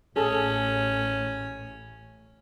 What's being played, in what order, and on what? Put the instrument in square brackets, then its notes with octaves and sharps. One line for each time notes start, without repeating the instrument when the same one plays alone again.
[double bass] A1 A2 [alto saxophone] C#4 [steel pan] G#4 A4 A5